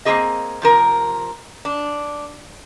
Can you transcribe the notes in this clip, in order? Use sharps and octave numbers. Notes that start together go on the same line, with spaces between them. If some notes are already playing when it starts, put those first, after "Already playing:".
A#3 C4 E4 F#4 G#4 D#5
C3 F3 A#4
D4